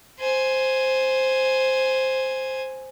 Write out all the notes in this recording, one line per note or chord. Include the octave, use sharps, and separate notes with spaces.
C5 G#5